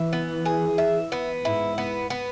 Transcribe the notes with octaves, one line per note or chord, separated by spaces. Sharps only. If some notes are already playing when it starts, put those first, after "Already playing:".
Already playing: E3 E5
B3
G#4
E5
B3
G#2 E4
B3
B3